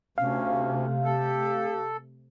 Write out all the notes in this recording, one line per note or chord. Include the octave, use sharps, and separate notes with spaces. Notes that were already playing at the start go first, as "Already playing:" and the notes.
D2 C3 A3 C#4 F5
G4 A4